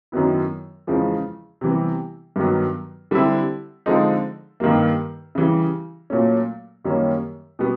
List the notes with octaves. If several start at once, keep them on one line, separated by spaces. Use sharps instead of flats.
F#2 D#3 F#3 B3 E4
E2 C#3 F3 G#3
C3 E3 G3 B3
G2 D#3 F#3 B3
D3 G3 C4 E4
D3 F3 G#3 C4 D#4
G2 D#3 G3 A#3
C#3 E3 G3
A#2 F#3 A3 C#4
F#2 D#3 G3 A#3 C#4
B2 G3 B3